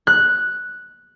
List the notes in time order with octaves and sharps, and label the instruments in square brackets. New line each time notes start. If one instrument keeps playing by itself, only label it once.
[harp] F#6